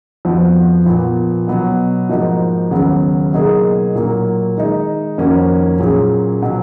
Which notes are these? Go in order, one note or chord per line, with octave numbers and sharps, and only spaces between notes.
F2 F3 B3 F#4
A#2 F3 B3
B2 F#3 B3
G#2 F3 A#3 D#4 F#4
D#2 C#3 F#3 B3
B2 F#3 A#3 D#4 G#4
A#2 F#3 A#3
D#3 G#3 D#4
F2 D#3 A#3 C#4 F#4
A#2 F#3 C#4 G#4
B2 F#3